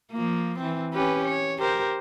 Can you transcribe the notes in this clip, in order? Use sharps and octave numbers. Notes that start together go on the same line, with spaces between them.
F3 A#3
E3 C4
C#4 G4 B4
C#5
G4 A#4 C5